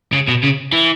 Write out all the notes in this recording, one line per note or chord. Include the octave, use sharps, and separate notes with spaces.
C#3
B2
C#3
E3